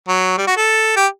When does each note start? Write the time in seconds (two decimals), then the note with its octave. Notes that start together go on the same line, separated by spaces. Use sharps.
0.08 F#3
0.38 G3
0.47 F#4
0.57 A4
0.96 G4